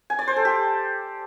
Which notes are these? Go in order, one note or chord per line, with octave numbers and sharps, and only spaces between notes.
G#5
D5
C5
A4
G4